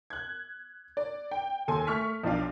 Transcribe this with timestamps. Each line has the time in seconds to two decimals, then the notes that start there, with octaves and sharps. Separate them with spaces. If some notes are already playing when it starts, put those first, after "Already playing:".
0.10 F#6 G#6
0.97 D5
1.31 G5
1.68 D#2 A4 G#5 C6
1.87 A3 C#6 F6 B6
2.24 B1 F3 D4 F5